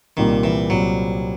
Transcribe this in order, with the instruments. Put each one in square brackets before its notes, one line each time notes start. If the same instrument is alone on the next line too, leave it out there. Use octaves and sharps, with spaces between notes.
[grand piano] C2 A#2 G3 A#3 [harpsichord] D#3
[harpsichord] E3
[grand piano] C2 A#2 G3 C4 [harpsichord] F#3